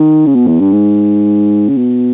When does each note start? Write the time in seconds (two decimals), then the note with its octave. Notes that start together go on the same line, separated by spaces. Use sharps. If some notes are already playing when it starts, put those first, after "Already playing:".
Already playing: D#3
0.26 C#3
0.35 B2
0.47 E2
0.60 G2
0.72 G#2
1.68 C#3
1.77 B2